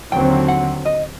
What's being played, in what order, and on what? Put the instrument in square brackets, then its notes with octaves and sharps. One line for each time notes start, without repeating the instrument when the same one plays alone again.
[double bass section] D#2 D3 F#3 C4 [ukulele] G5
[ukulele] F#5
D#5